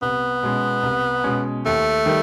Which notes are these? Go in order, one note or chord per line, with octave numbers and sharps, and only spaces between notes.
C2 B3
B2 G#3 C#4
C2
B2 G#3 C#4
D#2 A3
D#3 G3